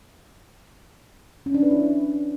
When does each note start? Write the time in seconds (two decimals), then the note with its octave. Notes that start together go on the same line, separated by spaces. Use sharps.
1.46 C#4
1.54 D4
1.63 B4
1.71 E4